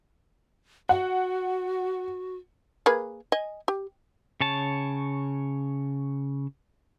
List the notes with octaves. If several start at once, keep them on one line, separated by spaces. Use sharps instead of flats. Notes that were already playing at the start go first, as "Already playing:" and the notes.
F#4 F#5
A#3 G#4 B4
D#5 G#5
G4
C#3 C#5 A5